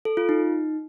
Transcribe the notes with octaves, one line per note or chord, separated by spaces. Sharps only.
A4
F4
D#4